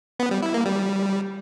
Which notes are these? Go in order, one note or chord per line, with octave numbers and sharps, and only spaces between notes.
B3
G3
E4
A#3
G3